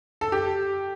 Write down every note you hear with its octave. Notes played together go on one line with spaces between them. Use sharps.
A4
G4